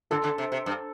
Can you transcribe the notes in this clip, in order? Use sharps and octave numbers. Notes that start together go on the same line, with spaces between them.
D3 A4
D3
C3
C3
G2